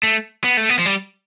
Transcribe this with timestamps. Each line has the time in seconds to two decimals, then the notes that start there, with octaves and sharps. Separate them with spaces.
0.03 A3
0.44 B3
0.57 A3
0.69 B3
0.79 F3
0.86 G3